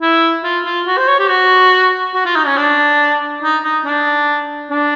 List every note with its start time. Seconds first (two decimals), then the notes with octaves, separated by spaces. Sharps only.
0.02 E4
0.44 F4
0.66 F4
0.87 F#4
0.97 C5
1.08 C#5
1.19 G4
1.29 F#4
2.14 F#4
2.25 F4
2.36 D#4
2.46 C#4
2.57 D4
3.43 D#4
3.64 D#4
3.85 D4
4.70 D4